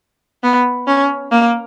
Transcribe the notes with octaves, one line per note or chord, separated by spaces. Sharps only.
B3
C#4
A#3